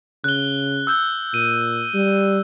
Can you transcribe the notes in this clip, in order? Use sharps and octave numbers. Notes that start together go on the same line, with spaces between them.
C#3 F#6 G7
E6 G6 G7
A#2 D#7
G3